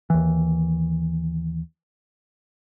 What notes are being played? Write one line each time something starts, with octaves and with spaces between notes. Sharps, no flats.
D#2 E3